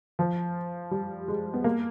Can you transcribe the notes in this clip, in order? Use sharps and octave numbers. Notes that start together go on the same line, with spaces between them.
F3
G3
G#3
B3
A#3